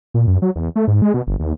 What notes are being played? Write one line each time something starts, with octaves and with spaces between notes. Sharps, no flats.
A#2
F#2
F#3
E2
A3
G#2
G#3
B2
G1
D#2